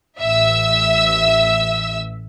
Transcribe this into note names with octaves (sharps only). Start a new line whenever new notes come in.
A1 E5 E6